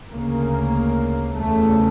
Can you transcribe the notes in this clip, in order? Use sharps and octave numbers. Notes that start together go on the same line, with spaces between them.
D2 C#3 A#3
E2 C#3 A3